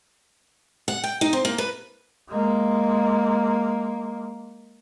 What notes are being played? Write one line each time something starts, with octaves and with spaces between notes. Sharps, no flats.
F#5
G5
D#4
C4
A#3
B4
G#3 A#3